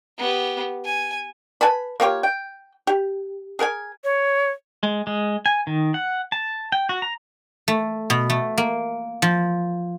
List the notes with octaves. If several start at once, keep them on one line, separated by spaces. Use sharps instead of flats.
B3 G4
G#5
B4 G#5 A5 B5
A#3 F4 G4 C#5
G5
G4
G#4 A#4 F#5 G#5
C#5
G#3
G#3
G#5
D#3
F#5
A5
G5
F#4
A#5
A3
B2
A3
A#3
F3